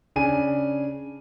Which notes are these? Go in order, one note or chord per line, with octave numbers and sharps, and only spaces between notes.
C#3 D4 G#5 D#7